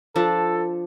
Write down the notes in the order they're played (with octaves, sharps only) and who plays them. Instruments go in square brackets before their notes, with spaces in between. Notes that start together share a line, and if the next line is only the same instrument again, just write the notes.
[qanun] F3 D4 [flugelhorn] A4